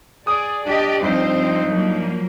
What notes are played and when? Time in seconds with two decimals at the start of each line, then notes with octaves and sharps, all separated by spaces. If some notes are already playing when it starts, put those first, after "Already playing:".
0.27 G#4 D5 D#6
0.65 D4 G4 D5 D#5
1.03 G2 F3 C4 D#4 C5
1.66 F3 F#3 A#3